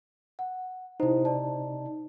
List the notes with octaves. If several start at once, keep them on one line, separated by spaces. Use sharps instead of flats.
F#5
C3 D#4 E4 C5
D5 A5